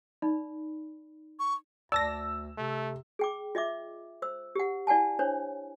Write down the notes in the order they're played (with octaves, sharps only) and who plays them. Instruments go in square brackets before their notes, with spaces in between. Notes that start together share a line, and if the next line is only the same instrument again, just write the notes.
[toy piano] D#4 D5 B5
[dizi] C#6
[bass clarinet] D2 [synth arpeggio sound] D5 A5 A#6 [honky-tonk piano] E6
[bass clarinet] C3 [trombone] A3
[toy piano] G#4 G5 D6
F4 D#5 E5 D6
C5 E6
G4 F#5
E4 D5 F#5 G#5 A5
D4 C5 C#5